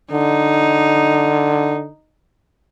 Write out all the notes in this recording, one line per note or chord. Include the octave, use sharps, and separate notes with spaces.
D3 D#4